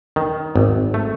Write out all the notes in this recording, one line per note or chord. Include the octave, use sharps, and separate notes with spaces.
D#3
G#1
A3